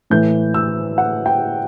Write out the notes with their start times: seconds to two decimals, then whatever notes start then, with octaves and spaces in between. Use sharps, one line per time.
0.10 A2 E3 A3 G6
0.54 E6
0.98 F#5
1.26 G5